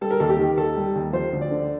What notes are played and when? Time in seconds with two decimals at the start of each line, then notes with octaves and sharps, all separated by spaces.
0.01 G3 A4
0.11 A#4
0.20 D#2 A4
0.29 G4
0.39 D#3
0.57 D#2 A4
0.76 G3
0.95 D#2
1.13 F3 C5
1.32 D2
1.41 D5
1.51 D3